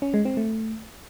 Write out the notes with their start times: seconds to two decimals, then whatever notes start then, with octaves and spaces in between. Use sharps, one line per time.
0.02 C#4
0.14 G#3
0.25 C4
0.37 A3